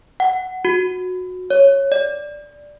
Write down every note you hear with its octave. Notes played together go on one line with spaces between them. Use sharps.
F#5
F#4
C#5
D5